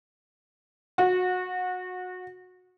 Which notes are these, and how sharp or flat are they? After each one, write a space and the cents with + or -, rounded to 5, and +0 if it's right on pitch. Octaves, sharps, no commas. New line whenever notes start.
F#4 -25